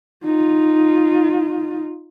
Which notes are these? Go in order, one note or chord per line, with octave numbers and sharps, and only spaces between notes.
D#4 F4